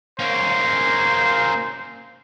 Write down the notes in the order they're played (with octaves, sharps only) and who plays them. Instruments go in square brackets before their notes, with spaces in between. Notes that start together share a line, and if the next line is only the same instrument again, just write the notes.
[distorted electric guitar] A#3 C#4 [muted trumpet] C5